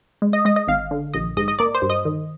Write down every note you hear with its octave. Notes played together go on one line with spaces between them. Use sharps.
G#3
D#5
G#3 D#5
D#5
G#1 F5
D3
A#1 D#5
G#2 D#5
D#5
A#3 D5
C5
G2
D#5
D#3